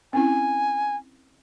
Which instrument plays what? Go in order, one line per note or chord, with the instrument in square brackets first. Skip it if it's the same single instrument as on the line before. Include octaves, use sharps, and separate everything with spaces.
[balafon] C4 C#4 E4 [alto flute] G#5